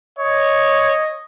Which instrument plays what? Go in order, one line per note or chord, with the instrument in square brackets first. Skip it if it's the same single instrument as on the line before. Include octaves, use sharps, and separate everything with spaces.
[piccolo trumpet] C#5 [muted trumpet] D#5